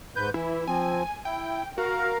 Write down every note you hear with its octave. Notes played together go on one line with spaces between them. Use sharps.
G#2 B4 G6
E3 E4
F3 C4 G#5
E4 G5
F#4 A#4 F5 A#5